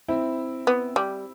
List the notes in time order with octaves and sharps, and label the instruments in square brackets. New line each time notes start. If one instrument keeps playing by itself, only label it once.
[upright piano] C4 E4
[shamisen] B3
G3